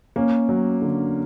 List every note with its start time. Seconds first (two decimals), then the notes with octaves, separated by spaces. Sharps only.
0.16 A#3 C#4
0.49 F#3
0.82 D3